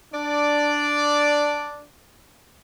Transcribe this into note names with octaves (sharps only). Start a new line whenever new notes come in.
D4 D5